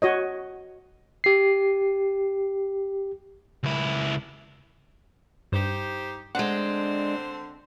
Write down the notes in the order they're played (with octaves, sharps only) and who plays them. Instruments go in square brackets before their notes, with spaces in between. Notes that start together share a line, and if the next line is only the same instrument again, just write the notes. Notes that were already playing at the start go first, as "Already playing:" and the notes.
[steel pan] F#4 C#5 D#5
[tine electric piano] G4 C7
[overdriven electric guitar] C#2 E4
[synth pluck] G2 [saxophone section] D#4 G4 C5
[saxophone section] D3 C4 C5 [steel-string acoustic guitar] G#3 D4 [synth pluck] F#5